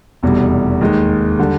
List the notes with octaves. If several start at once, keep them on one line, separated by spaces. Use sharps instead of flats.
F1 E2 B2 G3
D#2 D#3 G#3
D3 G3